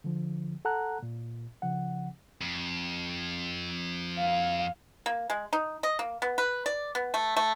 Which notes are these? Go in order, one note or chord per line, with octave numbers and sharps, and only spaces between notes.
D3 F3
A4 F#5 A5 A#5 F#6
A#2
C#3 F3 F#5
F2
F5
A#3
G#3
D#4
D#5
A#3
B3
B4
D5
B3
A3
A3